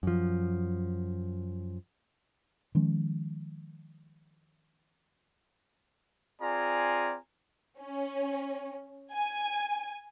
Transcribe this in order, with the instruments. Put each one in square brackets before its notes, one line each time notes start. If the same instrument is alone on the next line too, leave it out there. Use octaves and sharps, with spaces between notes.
[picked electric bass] F#2 F3
[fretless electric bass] D#3 F3 G#3 C#4
[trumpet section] C4 F4 G#4 D5 G#5 A#5
[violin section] C#4
G#5